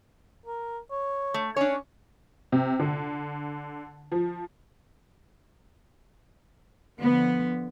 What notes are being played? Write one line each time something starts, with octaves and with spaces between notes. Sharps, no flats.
A#4
C#5
A3
C#4 D4 C#5
C3
D3
F3
D3 F3 B3